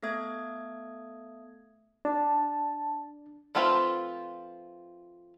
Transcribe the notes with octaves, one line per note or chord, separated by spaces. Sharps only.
A3 B3 A4 E5 D#6 G#6
D4 A5
F3 A3 C4 F4 B4